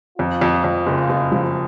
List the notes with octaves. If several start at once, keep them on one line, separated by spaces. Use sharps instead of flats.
F2 F4
F2
F2
F#1
F#1
F3